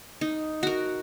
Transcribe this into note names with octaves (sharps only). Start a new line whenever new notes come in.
D#4
F#4 A#4